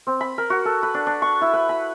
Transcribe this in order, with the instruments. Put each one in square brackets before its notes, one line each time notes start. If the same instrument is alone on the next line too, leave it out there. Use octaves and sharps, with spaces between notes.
[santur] C4
B5
A#4
F#4
A4
B4
D4
D4
C#6
E4
B4
B5